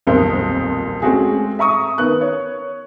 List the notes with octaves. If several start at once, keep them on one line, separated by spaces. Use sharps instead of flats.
D#1 B1 F2 A#4 C5
G#3 A3 C4 C#4 F#4 G#4
E5 A#5 C#6 D#6
D#3 B3 F#6
C#5